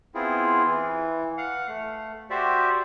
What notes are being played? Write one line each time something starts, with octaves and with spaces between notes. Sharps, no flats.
B3 C4 E4 F4 G#4
E3
F5 F#5
A3
F#4 G4 C5 D5 E5